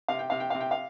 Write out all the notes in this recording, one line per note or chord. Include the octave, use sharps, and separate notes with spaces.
C3 F5
G5
C3 F5
G5
C3 F5
G5
F5